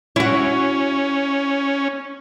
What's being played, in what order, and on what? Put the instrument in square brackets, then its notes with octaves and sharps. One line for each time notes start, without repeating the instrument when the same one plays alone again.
[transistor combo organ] C#4 [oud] E4 F#4